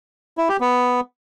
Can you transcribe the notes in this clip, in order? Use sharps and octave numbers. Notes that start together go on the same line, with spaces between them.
E4
G4
B3